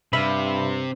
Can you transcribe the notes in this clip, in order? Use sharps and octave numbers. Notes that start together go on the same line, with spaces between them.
G2 C3 E5 F5 B5